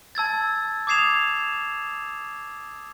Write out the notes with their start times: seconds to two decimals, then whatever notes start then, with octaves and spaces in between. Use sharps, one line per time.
0.15 A5 E6 G#6 A6
0.87 D6 D#6 G#6 C7 E7 F7